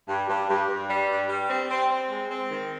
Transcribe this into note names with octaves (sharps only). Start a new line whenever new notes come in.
G2
G2
G2
G2
G3
G2
G3
C4
C4
C4
G#3
C4
D#3